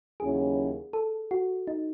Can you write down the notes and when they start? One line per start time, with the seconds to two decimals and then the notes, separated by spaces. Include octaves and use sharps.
0.20 D#2 C#3 F#3 C#4 E4 G#4
0.93 A4
1.31 F#4
1.67 D#4